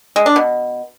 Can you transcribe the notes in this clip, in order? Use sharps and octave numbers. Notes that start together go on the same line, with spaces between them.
G#3
D4
B2